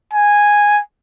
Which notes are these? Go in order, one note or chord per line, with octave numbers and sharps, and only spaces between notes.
G#5